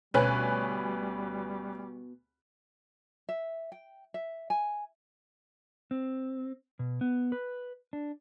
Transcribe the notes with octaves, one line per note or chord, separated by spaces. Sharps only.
D2 B2 G3 C#4 B4 G#5 F#6
E5
G5
E5
G#5
C4
B2
B3
B4
D4